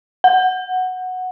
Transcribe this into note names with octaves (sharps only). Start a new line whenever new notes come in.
F#5